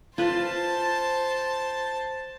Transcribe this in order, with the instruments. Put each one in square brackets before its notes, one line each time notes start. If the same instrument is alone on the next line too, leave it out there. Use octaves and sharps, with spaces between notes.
[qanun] F4 B4 C6 [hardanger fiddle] C5 A5